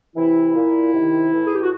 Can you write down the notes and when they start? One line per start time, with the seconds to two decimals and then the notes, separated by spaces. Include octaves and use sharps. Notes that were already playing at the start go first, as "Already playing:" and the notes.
0.16 C3 E3 E4
0.56 A#2
0.93 C3 D#3
1.32 A2 E3
1.47 G#4
1.55 G4
1.62 F#4